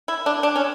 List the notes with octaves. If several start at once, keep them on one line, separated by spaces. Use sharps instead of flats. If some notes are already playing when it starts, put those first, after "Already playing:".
E4
D4
D4
C#4